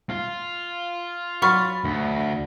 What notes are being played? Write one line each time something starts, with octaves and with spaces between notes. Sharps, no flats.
F4
F#3 F#5 B5 C#6 F6 A6
D2